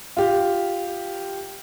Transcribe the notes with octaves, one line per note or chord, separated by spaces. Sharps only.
F4 G4